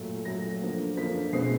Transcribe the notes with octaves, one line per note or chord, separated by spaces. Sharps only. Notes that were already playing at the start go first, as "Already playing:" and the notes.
Already playing: A#2 F#3 A3
A#2 F#3 A3 A#6
D3 F3 A#3
D3 F3 A#3 B6
B2 G#3 C4 C7